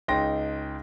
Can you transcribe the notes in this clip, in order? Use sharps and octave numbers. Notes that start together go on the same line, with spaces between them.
C#2 D#4 G5 C6 A#6